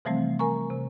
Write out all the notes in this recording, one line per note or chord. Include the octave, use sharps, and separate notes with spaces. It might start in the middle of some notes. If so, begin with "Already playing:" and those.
C3 E3 F3 G3 A3 C4
A#4 G#5 A#5 C#6
C3